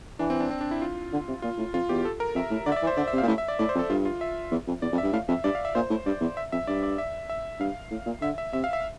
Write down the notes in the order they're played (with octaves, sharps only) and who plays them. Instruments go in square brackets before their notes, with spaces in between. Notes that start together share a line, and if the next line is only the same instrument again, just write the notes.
[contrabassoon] E3 [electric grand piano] D4
[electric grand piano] C4
D4
C4
D4
E4
F4
[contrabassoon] D3
C3
[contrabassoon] A#2 [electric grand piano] F4
[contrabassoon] A2
[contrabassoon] F2 [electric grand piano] F4
[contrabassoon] E2 [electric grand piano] G4
[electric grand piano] A4
A#4
[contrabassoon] F2 [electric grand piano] E5
[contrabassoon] A2
[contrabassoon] D3 [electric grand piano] D5
[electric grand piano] E5
D5
[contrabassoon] E3
[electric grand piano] C5
[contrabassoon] D3 [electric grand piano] D5
[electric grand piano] E5
[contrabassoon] C3
[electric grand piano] F5
[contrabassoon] A#2
[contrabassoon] A2 [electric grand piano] E5
[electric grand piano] E5
D5
[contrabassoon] A2 [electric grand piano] D5
[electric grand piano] C5
[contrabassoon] F2
[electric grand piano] A4
[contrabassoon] G2 [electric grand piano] F4
[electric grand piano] F4
E5
[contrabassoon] E2
F2
[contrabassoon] E2 [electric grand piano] D5
[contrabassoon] F2
[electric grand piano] E5
[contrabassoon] G2
[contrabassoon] A2 [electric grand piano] F5
[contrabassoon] F2 [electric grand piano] E5
[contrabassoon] G2 [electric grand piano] D5
[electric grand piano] F5
E5
[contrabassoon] A#2 [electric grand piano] C5
[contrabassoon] A2
[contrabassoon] G2 [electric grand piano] D5
[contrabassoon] E2
[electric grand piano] E5
[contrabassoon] F2 [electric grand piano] E5
[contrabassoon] G2 [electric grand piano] D5
[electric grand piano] D5
E5
E5
[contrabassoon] G2 [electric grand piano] F5
[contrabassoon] A2
A#2
[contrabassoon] D3 [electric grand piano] E5
[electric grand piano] E5
[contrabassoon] C3 [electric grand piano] E5
[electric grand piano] F5
E5